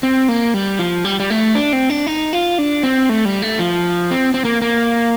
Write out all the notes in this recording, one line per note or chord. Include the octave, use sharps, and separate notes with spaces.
C4
A#3
G3
F3
G3
G3
A3
D4
C4
D4
D#4
F4
D4
C4
A3
G3
A3
F3
C4
C4
A#3
A#3